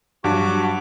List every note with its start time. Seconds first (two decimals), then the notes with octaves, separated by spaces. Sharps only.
0.24 G2 F#3 F#4 D6